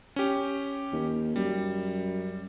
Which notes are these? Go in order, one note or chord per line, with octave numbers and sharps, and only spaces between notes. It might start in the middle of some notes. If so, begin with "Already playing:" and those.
C#4 G4
D#2
F#2 G3